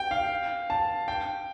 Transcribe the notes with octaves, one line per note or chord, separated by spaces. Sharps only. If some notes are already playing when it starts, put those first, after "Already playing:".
Already playing: G5
F5
A5
G5